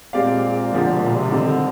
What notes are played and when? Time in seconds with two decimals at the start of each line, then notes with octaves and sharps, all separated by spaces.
0.13 A#2 G#3 C4 G4 D5 F5
0.72 A#2 D3 F3 G#3
0.87 A#2
0.97 C3
1.02 A#2
1.17 C3
1.31 D3 D#3 G3 C4 D#4 G4